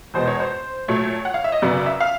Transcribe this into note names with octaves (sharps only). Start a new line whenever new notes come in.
E2 B2 G#3 B3 C5
C#5
C5
A#2 F#3 A3 C#5
F#5
F5
E5
D#5
F#2 C#3 F#3 B3 D5
E5
F5